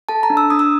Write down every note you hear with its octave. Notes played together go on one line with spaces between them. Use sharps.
A4 A5
A#5
D4
E6
D4 D#6
E6